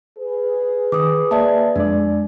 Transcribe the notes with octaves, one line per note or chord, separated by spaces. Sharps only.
G#4 B4
D#3 D6 D#6
A#3 D5 E5 A5
F2 G#3 D4 D5